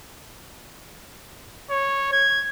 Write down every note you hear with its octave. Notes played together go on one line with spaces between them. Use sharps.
C#5
G#6